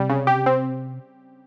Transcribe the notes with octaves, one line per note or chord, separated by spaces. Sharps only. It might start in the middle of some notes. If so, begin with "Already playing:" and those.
Already playing: C3 G3
C#3
G4
C4